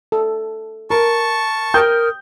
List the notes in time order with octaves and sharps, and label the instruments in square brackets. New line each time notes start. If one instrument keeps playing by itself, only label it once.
[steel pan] A4
[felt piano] A#4 [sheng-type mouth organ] A5 C#6
[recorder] A#4 [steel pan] G5 [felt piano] D#6 G6